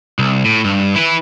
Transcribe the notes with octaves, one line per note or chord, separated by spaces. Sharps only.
C2
A2
G2
E4 B4